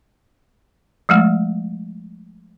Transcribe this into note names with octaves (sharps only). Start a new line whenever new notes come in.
F3 G#3 A3